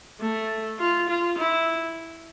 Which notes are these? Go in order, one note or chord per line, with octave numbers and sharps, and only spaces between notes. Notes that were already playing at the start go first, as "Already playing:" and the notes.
A3
F4
F4
E4